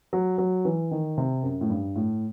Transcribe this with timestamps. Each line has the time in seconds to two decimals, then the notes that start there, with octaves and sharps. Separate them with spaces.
0.13 F#3
0.38 F#3
0.65 E3
0.91 D#3
1.18 C3
1.42 F#2
1.61 A2
1.70 G2
1.96 A2